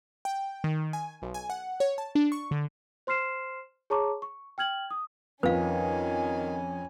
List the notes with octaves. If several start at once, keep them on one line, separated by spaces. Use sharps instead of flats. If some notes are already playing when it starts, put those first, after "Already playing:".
G5
D#3
G#5
B1
G#5
F#5
C#5
A5
D4
C#6
D3
C5 C6 F6 C7 E7
G#4 C#5 A5 A#5 C#6 D6
C#6
G5 F6 G#6 F#7
D#6
F2 D#3 C#4 B4 F5 G#5